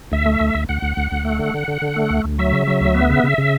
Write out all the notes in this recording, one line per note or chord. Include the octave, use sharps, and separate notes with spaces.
D2 E5
A3
D2
D2
D2 F#5
D2
D2
D2
A3
D3
D3
D3
D3
A3
D2
D2
F#3 E5
C#3
F#3
D2
B3
C#3
C#3
C#3